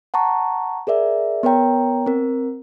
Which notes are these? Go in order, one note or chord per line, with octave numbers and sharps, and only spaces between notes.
F#5 A5 A#5 C#6
G#4 A#4 D5 E5
B3 A#4 C#5 G5 A#5
C4 A#4